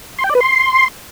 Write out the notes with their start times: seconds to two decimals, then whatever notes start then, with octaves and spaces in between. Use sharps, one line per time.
0.18 C6
0.24 G5
0.29 D5
0.35 B4
0.40 C6